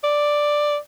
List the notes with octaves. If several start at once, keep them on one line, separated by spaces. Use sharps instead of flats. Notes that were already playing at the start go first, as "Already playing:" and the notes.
D5